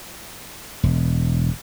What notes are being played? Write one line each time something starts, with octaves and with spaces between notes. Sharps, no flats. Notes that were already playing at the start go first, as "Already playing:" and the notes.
E1